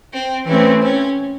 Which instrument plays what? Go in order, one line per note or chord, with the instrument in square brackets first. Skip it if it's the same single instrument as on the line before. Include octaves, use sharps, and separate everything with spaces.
[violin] C4
[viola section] E3 A3 C4 [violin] C#4
[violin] C#4